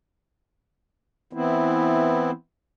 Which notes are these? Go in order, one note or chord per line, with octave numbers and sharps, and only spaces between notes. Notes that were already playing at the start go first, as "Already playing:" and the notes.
E3 B3 C4 E4